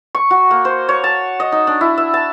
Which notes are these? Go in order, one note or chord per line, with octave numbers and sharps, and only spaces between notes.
C#6
F#4
A#3
C5
C#5
A5
D#5
D#4
D4
E4
E5
A5